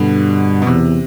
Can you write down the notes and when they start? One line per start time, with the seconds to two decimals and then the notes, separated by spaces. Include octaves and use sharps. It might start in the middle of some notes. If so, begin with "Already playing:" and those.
Already playing: G2 B2 D3
0.62 B2
0.67 E2 C3